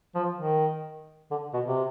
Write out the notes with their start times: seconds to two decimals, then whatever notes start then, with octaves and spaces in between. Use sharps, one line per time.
0.15 F3
0.38 D#3
1.31 D3
1.53 B2
1.65 C3